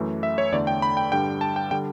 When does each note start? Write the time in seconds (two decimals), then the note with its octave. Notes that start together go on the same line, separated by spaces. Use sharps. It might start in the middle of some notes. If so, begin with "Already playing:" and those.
Already playing: F#2 E3 A3
0.23 E5
0.38 C#5
0.52 E2 D3 A3 D5
0.67 G5
0.82 B5
0.97 G5
1.12 G2 D3 G3 G5
1.41 A5
1.56 G5
1.71 D3 G3 G5